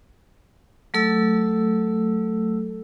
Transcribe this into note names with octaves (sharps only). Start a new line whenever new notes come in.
F#3 A3 A4 E6